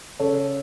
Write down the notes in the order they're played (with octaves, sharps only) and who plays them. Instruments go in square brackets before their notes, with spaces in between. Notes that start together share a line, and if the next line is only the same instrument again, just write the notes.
[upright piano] C#3 A4 C#5